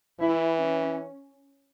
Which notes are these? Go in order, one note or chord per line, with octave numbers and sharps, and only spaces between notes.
E3 E4
C#4